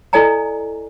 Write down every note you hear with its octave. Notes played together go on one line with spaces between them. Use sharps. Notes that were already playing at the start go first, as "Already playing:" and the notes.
E4 A4 D5 D#5 G#5 A#5